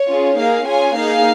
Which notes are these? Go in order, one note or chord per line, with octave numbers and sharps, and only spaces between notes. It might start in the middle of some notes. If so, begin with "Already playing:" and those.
Already playing: C#5
C#4 F4 G#4
A#3 D#4 G#4 F5
C#4 F4 G#4 G#5
A#3 D#4 G#4 F5